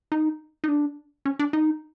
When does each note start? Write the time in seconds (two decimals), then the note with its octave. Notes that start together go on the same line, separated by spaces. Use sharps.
0.12 D#4
0.64 D#4
0.68 D4
1.25 C#4
1.39 D4
1.53 D#4